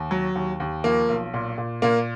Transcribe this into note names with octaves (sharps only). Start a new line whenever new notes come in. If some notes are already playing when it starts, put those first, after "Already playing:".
Already playing: D#2
F#3
D#2
D#2
F3 A#3
B1
A#2
A#2
A#2 A#3